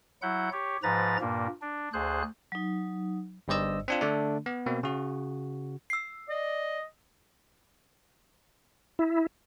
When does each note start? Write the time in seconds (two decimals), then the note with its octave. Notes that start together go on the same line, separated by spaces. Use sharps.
0.22 F#3 E4 F#5 G6
0.52 G4 C#5
0.83 G#2 F3 B4 A#5 A6
1.21 G2 A#2 A#3
1.62 D4
1.93 D2 G#4 C5 F#6
2.52 F#3 D#4
3.48 G1 G2 C5 D5 D#5 E6
3.88 C4 D4 F4
4.01 D3 A3 D4
4.46 B3
4.66 B2 A#3 C4
4.83 C#3 F#4
5.90 E6 C7
6.29 D5 D#5
8.99 E4